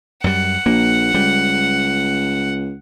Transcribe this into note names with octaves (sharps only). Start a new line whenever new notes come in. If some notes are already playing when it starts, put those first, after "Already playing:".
F#2 G3 F#5
A#1 A#3
C#2 G3